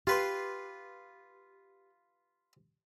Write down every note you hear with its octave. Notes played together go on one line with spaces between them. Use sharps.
F4 G4 B4 C6